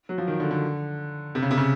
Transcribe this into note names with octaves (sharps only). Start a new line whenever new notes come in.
F#3
F3
D#3
D3
D3
C3
C#3
C3
C#3